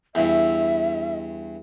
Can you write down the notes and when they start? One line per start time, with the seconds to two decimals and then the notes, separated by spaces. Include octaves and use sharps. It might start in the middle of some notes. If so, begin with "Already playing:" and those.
0.15 E2 G2 E5